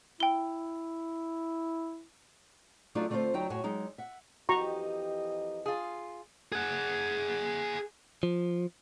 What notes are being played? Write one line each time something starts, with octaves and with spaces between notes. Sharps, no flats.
E4 G5 G7
F#3 A3 D4 D#4 F4
D3 A3 C4 D4 F4 C5
D2 F#3 D#4 G5
F#2 A2 F#4 C#5 G#5
F#3 G#3 D#4
E5 F#5
F2 E3 D#4 F#4 G4 D#5 A#5 C#6
F4 G#4
G#4 F#5
F3